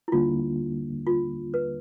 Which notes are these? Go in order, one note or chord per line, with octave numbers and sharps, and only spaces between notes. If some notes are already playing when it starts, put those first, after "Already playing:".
E4
D#2 D3 G3 A#3 D4 F4
F4
B4